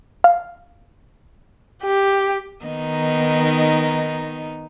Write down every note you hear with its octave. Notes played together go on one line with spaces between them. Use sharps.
F5
G4
D#3 B3 D#4